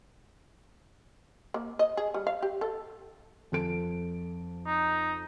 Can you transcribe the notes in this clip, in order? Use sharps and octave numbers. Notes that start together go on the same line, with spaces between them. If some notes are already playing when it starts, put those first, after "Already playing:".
A#3
D#5
G#4
G3
F5
G4
A4
F2 A4 D7
D#4